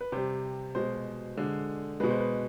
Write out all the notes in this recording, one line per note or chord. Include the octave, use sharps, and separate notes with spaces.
B4
C3 G3 C5
B2 G#3 C5
D3 G#3
B2 G#3 B4
C5
B4